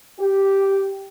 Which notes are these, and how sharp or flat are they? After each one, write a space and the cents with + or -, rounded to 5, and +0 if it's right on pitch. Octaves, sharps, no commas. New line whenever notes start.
G4 -5